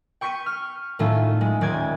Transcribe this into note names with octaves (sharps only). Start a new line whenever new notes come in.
G5 C#6 G6 B6 C#7 D#7
F6
A2 D#3 A3 C#4 F4
G#3
D#1 G#3 D5 G6 G#6